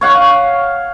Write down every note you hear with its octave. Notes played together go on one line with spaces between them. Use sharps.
C#5 F5 F#5